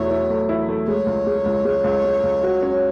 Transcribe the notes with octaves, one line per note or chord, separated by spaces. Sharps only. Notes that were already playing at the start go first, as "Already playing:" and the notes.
Already playing: E2 B2 A3 E4 C#5
E4
A3
E4
A3
G#3 C#5
C#2
G#3
C#2
G#3
C#2
G#3
C#2
F#4
C#4